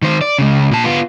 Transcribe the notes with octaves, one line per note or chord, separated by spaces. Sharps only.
D#3 C5
D5
C#2 C#3
A#2 A5
B3 F4